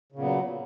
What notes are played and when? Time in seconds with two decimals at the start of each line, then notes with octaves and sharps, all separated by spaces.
0.12 C#3
0.16 A#2
0.19 B3
0.22 F#3